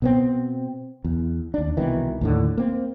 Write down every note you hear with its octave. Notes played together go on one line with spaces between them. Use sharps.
B2 B3 C4
E2
D#2 D4
C2 B2 D#3 E3
D#2 A2 D3
A#3 C4